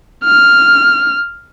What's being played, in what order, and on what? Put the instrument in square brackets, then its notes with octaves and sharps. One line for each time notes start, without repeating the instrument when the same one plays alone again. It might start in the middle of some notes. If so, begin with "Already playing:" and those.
[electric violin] F6